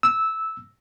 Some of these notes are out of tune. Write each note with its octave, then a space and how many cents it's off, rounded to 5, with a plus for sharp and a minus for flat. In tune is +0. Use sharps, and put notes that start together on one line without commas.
E6 -10